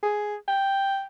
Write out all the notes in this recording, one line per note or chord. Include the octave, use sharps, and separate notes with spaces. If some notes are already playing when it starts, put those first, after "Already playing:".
G#4
G5